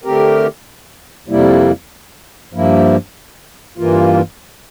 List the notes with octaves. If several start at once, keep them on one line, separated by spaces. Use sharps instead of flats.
D3 A3 C4 G4 A#4
F2 C3 G3 A#3 E4
G2 F3 A#3 E4
G2 E3 A#3 F4